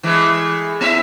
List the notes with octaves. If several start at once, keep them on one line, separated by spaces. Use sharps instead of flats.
E3 G#3 A3
B3 E4 E5